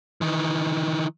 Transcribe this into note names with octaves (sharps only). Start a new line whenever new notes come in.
D#3 E3